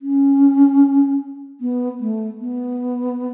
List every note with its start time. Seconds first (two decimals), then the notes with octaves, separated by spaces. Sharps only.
0.02 C#4
1.61 B3
2.00 A3
2.40 B3